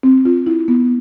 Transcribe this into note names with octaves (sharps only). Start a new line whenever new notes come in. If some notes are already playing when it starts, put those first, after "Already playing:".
C4
F4
E4
B3